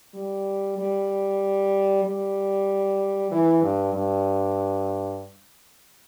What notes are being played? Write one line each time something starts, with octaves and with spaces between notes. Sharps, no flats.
G3
G3
G3
E3
G2
G2